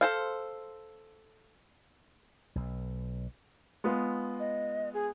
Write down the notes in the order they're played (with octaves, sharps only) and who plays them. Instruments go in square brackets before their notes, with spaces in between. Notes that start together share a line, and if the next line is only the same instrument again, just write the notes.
[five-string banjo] A4 C5 F5
[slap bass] B1
[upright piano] G#3 B3 F4
[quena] D#5
G#4